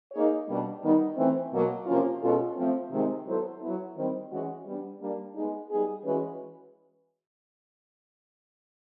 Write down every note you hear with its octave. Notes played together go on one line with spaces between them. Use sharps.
A#3 D#4 G#4 C#5
B2 G3 A#3 D4
D#3 G3 B3 D#4
E3 A3 C4
B2 F#3 A#3
C3 F3 A#3 C#4 F4
B2 G#3 C#4 F4 A4
F3 A3 C4
C3 D#3 G#3 C4
F#3 B3 E4 A4 C5
F#3 B3 E4
D#3 G3 C4
E3 G#3 C#4 F#4
G3 B3 D4
G3 A#3 D4
G#3 B3 D#4 G#4
G3 B3 D#4 G#4
E3 G#3 C#4 F#4 B4